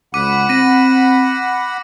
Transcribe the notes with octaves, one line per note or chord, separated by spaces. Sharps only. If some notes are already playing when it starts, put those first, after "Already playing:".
C#2 F#5 B5 D6 D#7
C4 A#6 D#7